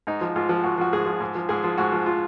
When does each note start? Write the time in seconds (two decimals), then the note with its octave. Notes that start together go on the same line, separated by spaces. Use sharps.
0.07 G#2 D#4
0.21 F3
0.36 G#2 F4
0.49 F3
0.64 G#2 F#4
0.78 F3 F#4
0.93 G#2 G#4
1.06 F3
1.20 G#2
1.35 F3
1.49 G#2 G#4
1.64 F3
1.78 G#2 F#4
1.92 F3
2.06 F4